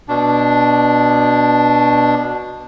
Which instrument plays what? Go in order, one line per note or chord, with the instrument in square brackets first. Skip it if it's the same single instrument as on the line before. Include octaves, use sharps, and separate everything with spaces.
[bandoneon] B2 D4